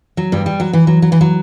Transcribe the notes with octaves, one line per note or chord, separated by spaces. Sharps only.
F#3
G2 G3
G3
F#3
E3
F#3
F#3
E3
F#3